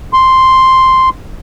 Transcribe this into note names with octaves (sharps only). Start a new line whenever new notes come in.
C6